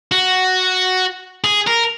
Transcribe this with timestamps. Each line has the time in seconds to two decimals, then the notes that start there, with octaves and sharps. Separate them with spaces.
0.12 F#4
1.44 G#4
1.67 A#4